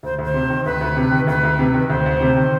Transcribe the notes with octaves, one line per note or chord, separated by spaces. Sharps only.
D2 C5
D2
C5
C3
D#3
D2 B4
D2
C3
D#3
D2 B4
D2
C3
D#3
D2 C5
D2
C3
D#3